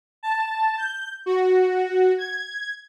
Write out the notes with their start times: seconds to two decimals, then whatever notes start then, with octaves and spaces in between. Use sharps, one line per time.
0.23 A5
0.77 G6
1.26 F#4
2.18 G#6